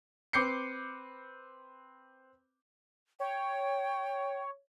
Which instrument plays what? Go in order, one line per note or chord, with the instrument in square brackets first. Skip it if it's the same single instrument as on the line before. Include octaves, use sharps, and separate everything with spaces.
[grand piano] C4 B4 D6 G6 C7 C#7
[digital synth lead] C#5 [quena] G5